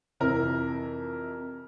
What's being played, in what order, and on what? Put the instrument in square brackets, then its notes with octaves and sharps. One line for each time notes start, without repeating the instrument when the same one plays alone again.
[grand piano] F2 C3 E3 A#4